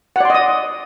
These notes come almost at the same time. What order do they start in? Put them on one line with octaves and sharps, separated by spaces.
F#5 D5 C6 D#5 D#6